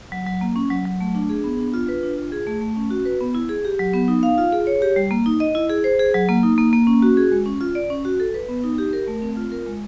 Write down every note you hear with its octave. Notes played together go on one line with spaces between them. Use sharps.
F#3
F#3
A#3
C#4
F#3
F#3
A3
D4
G#4
B3
D4
F4
B4
D4
F4
G#4
A3
A3
C#4
F#4
B4
B3
E4
G#4
G4
F#3
B3
D#4
F5
F4
G#4
C#5
G4
G3
A#3
D#4
D#5
E4
G#4
C5
G#4
F#3
A#3
D#4
A#3
A#3
C#4
F#4
G#4
G#3
C#4
F4
D5
C#4
F#4
A4
B4
B3
D#4
G4
A#4
A3
C4
F4
A#4
G#3